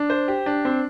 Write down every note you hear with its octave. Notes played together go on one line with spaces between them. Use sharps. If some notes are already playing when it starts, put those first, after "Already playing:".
Already playing: D4
C5
G4
D4
C4